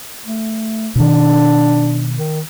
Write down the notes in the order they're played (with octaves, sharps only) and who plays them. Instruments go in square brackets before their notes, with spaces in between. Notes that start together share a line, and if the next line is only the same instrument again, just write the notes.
[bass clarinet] A3
[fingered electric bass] B2 D#3 [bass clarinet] D4
[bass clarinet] D#3